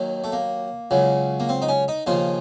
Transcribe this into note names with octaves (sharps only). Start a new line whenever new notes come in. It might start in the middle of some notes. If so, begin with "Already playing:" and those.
Already playing: D#2 D#3 F#3
A3
A#3
C#2 C#3 F#3
A#3
C4
D#4
C#4
D#4
D#2 C#3 F3 F4